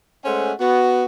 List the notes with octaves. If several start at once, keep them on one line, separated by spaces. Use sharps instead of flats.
G#3 A3 C#4 C5 F#5
B3 F#4